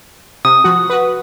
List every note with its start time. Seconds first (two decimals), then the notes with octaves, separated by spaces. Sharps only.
0.45 C3 D#6
0.64 F3 F#4
0.90 F#4 B4